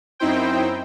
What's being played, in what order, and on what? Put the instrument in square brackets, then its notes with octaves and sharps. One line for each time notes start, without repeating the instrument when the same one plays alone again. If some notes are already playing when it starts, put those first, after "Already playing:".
[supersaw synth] F#2 C4 D#4 E4 C5 G5